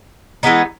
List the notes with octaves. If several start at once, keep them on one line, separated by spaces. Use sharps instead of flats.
E3 G#3 B3 D#4